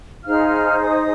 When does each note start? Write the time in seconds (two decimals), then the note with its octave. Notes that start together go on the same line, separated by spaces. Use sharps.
0.25 D#4 G#4 C5 F5 F6
0.83 D#5 D#6